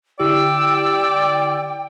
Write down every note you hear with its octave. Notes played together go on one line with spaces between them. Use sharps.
D3 E4 G4 D5 G5 E6